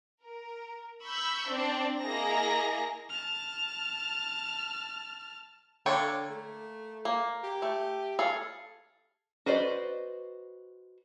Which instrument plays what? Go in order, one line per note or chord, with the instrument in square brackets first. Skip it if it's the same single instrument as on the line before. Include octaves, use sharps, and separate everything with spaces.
[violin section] A#4
B5 C#6 E6 G6
C4 D4 C5
A#3 E4 G#4 D#5 A#5 A#6
[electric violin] A5 F6
[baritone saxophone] D3 [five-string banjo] A#3 C#5 G5
[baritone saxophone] A3
[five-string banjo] A#3
[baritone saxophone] G4
[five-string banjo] A3
G#4 A4 F5
F#4 B4 C5 D5 D#5